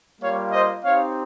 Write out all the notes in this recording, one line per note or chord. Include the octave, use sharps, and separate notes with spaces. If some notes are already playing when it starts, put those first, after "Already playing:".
G3 A#3 F4 C#5 F5
C5 D#5
C4 D#4 G4 C#5 F5